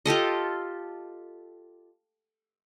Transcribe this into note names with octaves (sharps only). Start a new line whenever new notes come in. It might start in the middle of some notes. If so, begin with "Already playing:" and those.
F4 G4 A4 D#5